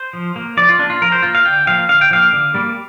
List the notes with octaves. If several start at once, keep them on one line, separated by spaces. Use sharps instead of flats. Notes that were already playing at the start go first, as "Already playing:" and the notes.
Already playing: C5
F3
A#3
F3 D5
F4
A#3 D4
F4
F3 A#4
C5
A#3 F4
F5
D3 G5
F3 A#3 F5
D3 F5
G5
F3 A#3 F5
D3
G3 A#3